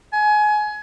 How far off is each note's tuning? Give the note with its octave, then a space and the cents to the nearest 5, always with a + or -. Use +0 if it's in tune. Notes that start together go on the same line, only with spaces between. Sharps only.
G#5 +25